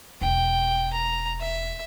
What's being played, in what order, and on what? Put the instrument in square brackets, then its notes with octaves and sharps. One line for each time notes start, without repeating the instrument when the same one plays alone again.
[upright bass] E1 [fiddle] G5
[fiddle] A#5
E5